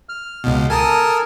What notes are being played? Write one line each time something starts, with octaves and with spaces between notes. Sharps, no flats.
F6
C#2 B2
A4 A#4 G#5 A5 D#6 F6